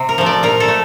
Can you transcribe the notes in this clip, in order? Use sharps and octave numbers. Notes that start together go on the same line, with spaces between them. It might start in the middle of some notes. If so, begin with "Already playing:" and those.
Already playing: C3
A#4
F3 A3
D5
A#2 A#4
A4
A3